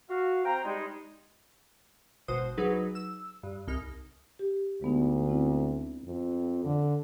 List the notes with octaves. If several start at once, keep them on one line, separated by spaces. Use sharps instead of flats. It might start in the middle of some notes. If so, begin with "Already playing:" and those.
F#4 F5
C4 C5 G5 A#5
G3 G#3 D#4
G#1 B2 F#4 C5 D#6
F#3 D#4 G#4 B4
E6
G2
C2 D#4 F6
G4
D2 G#3 B3 D#4
C4 E4
F2
D3